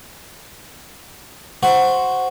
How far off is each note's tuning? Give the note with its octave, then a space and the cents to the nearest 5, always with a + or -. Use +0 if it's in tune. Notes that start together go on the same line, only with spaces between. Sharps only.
F#4 +0 C5 +0 F#5 +0